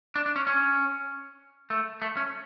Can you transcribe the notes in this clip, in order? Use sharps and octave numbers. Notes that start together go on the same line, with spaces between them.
D4
D4
C#4
C#4
A3
A3
C#4